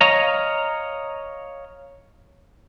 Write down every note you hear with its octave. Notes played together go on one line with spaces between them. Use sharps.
C#5 D#5 F5 A#5